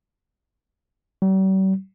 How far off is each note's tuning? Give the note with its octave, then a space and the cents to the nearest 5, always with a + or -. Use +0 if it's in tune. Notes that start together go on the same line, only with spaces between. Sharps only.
G3 -45